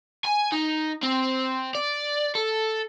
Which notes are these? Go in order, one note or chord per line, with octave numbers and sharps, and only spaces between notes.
G#5
D#4
C4
D5
A4